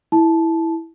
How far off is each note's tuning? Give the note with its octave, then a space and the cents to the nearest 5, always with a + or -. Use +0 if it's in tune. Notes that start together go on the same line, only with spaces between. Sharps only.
E4 -5 A5 -15